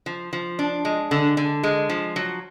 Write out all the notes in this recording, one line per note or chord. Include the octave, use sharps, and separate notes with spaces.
F3
F3
D4
G#3
D3
D3
G#3
F3
F#3